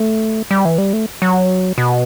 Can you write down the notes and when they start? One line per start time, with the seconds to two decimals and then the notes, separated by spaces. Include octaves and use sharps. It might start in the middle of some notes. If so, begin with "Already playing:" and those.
Already playing: A3
0.51 G3
0.65 E3
0.78 G3
0.93 A3
1.22 F#3
1.78 B2